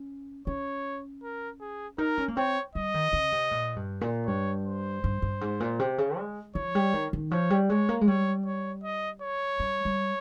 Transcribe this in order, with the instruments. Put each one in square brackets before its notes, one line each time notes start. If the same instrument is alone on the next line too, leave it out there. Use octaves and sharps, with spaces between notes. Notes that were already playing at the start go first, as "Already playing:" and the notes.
Already playing: [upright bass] C#4
[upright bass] C#4 [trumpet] C#5
[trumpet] A#4
G#4
[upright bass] D#4 [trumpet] A#4
[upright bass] C#4
A#3
[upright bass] C4 [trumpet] C#5
[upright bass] G3 [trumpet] D#5
[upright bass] D#3
C#3
C3
A#2
G2
A#2
[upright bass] G2 [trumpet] C#5
[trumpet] C5
[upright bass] G2
G2
G#2
A#2
C3
C#3
G#3
[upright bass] F3 [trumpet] C#5
[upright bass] G3
D#3
D#3
[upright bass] F3 [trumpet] C#5
[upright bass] G3
[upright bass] G#3 [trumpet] C#5
[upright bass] A#3
G#3
[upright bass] G3 [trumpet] C#5
[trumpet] C#5
D#5
C#5
[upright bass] G3
G3